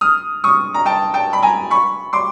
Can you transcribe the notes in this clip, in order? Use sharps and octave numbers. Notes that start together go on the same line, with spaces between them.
D#6 F6
C#6 D#6
A#5
G5 A5
G5 A5
B5
G#5 A#5
B5 C#6
C6 D6